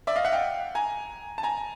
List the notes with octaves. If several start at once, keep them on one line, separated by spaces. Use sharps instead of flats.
D5 E5
D#5 F5
E5 F#5
F5 G5
G#5 A#5
A5
G#5 A#5